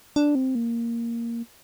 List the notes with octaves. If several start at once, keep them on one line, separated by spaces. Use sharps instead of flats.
D4
C4
A#3